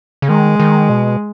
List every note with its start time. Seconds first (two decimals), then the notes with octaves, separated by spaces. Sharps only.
0.22 C#3
0.28 D#3 G#3
0.60 D#3
0.89 B2